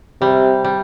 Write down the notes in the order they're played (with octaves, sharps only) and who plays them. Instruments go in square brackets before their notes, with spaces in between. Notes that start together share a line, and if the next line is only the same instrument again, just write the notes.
[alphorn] C3 [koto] G3
[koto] G3